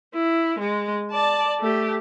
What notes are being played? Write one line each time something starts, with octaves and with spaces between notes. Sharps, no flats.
E4
G#3
D5 A5
A3 G4